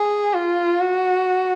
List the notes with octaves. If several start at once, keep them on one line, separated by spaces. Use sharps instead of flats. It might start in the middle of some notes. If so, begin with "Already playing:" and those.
Already playing: G#4
F4
F#4